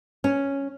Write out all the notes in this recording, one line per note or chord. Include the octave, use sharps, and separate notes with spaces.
C#4